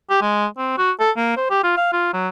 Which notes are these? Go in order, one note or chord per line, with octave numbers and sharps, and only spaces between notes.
G4
G#3
C4
F#4
A4
A#3
C5
G4
F4
F5
F4
F#3